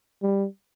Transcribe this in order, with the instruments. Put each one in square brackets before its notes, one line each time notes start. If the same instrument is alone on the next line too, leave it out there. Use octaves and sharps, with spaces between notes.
[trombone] G3